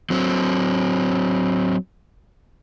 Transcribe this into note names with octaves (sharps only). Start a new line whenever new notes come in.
F#3 C4